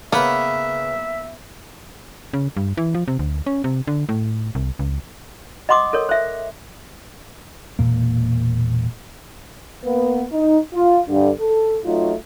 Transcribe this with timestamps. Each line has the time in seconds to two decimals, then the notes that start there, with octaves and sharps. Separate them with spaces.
0.12 C#3 A#3 B3 B4 E5
2.33 C#3
2.57 G2
2.77 E3
2.95 F3
3.08 C3
3.19 D2
3.47 C#4
3.64 C3
3.87 D3
4.09 A2
4.55 C2
4.79 C#2
5.69 D#5 F#5 C6 D6 D#6
5.93 A4 A#4 C#5
6.09 C5 E5
7.79 E1 F#2 A#2 A#3
9.84 A#3 B3 B4
10.32 D#4
10.73 F4
11.08 G2 D3
11.40 A4
11.84 F#3 A3 D#4 F4